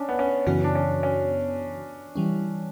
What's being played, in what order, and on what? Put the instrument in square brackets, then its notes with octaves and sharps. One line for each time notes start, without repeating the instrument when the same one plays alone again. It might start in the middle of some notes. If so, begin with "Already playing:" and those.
Already playing: [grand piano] C#4 D4
B3
C#4
[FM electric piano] F#2 C#3 E3 B3 F#4 [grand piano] C#4
[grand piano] D4
C#4
C#4
[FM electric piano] E3 G3 C#4